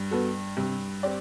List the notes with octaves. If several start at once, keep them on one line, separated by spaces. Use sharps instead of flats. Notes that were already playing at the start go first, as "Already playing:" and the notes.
Already playing: G2
B3 F#4 A4
G2 C3
C4 G4 D5